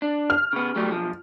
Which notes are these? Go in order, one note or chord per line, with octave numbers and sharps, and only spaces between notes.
D4
F6
C#3 B3
F#3 G3 A3
B1 F3